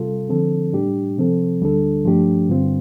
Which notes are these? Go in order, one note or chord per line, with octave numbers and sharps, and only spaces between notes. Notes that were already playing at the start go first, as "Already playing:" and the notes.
Already playing: C3 G3 F4 A4
D3 F3 C4 A4
A2 G3 D4 G4
C3 F3 C4 A4
D2 D3 G3 D4 A4
G2 F3 A3 D4 G4
G2 D3 G3 C4 F4